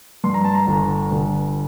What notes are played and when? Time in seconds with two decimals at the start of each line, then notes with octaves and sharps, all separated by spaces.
0.24 G2 C6
0.34 A#5
0.44 A5
0.55 A#5
0.67 G1
1.12 G1